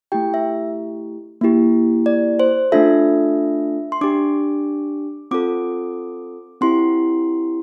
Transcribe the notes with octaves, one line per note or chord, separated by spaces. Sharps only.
A3 E4 G4 G5
E5
A#3 E4 G4
D5
C5
A3 D4 F4 A4 E5
C6
D4 G4 D6
C4 F4 A4 D6
C4 E4 G4 C6